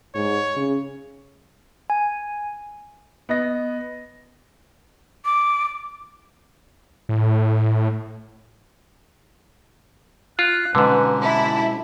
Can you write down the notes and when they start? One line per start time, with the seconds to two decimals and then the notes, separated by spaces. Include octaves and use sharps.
0.15 G#2 C#5
0.56 C#3
1.90 G#5
3.29 B3 D#5 A#6
5.25 D6
7.09 A2
10.39 F4 F#6
10.75 G#2 B2 D3 G#3 C#4 B4
11.22 E4 A5